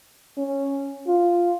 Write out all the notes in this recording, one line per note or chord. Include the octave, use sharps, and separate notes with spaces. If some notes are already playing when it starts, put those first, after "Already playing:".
C#4
F4